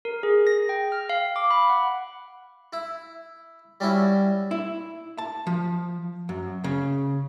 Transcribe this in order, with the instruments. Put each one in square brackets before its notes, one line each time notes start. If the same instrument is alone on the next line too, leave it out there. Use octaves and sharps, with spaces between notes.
[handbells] A#4
G#4
A#6
G5
F6
F5
D6
B5
F#5
[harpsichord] E4
G3 C#4 E4 F#4
[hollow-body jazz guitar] E4
A5
F3
F#2
C#3